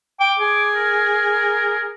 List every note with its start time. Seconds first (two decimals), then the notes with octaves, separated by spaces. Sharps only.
0.20 G5 D6
0.39 G#4
0.76 A#4